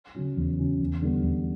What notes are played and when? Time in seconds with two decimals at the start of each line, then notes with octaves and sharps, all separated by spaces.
0.15 C#3 F#3 C#4
0.37 E2
0.59 C#3 F#3 C#4
0.80 E2
1.02 D3 G3 B3
1.23 E2